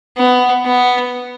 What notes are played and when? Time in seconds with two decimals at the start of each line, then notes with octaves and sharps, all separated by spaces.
0.17 B3
0.64 B3